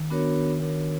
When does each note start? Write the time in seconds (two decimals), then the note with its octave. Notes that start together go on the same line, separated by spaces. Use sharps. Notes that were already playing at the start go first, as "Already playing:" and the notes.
Already playing: D#3
0.10 B3 D4 F#4 A#4 C#5
0.61 B3 D4 F#4 A#4 C#5